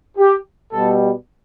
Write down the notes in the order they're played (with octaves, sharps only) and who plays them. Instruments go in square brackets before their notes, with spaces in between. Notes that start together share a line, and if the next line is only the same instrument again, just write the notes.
[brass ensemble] G4
B2 G3 A4